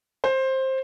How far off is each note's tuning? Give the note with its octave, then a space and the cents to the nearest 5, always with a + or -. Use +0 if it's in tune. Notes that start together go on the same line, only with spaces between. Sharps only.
C5 +15